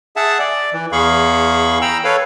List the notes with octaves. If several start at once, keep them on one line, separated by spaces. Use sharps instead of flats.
G#4 E5 F#5 A5
D5
E3
E2 G#4 F5 B5 C#6
G5 A#5 B5 E6
A4 B4 C#5 F5